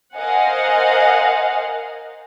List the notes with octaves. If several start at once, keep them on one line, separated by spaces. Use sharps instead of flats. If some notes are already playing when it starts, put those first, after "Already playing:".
A#4 C5 D#5 F5 F#5 G#5